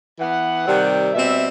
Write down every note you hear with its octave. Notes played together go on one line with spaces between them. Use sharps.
E3 B3 F#5
C3 D#3 G3 C4
B2 G3 C4 E5